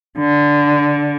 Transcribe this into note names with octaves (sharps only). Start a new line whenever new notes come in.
D3